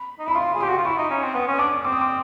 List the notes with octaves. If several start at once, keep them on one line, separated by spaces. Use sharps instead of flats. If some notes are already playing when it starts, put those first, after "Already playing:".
Already playing: B5
D#4
E4 B5
F4 C6
G#4
G4 C6
F#4
F4
E4 C#6
D#4
C#4
C4
B3 D#6
C#4
D4 D6
C4 D6
D#6
D6